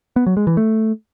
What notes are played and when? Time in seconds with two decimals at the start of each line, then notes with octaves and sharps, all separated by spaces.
0.16 B3
0.26 F#3
0.37 G#3
0.47 E3
0.57 A3